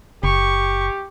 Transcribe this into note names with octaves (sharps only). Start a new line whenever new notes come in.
F#1 G4 C#6